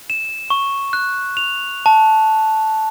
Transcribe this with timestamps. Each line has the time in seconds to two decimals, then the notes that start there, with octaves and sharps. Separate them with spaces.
0.10 E7
0.50 C#6
0.93 F#6
1.37 F7
1.86 A5